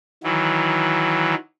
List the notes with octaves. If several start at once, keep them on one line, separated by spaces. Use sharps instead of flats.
D#3 E3 F#3